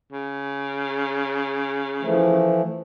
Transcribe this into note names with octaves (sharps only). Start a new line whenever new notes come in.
C#3
E3 F3 A3